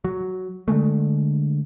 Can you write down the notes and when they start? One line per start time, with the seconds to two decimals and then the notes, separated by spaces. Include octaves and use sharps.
0.04 F#3
0.68 D3 F3 G#3 A3